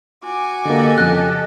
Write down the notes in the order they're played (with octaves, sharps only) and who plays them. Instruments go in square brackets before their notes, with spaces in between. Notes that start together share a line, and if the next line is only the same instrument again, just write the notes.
[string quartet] F#4 G#5 D6
[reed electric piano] D3 A#3 [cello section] G4 A4 D#5
[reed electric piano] F2 C#3 [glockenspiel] F#6